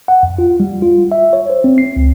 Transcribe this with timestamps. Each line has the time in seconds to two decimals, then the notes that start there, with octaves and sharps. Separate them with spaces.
0.08 F#5
0.23 F2
0.38 F4
0.60 G3
0.82 F4
1.12 E5
1.33 C#5
1.50 C5
1.64 C4
1.78 C7
1.96 C#2